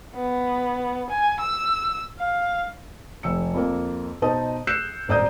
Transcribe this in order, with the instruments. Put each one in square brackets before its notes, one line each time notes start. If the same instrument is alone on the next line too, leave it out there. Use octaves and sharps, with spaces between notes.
[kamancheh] B3
G#5
E6
F5
[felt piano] F1 E6 C#7
F2 A#3
B2 D#4 C5 A5 D#6
E6 F#6 G6 C7 C#7 E7
D#1 G#1 D5 A#5 D#6 G6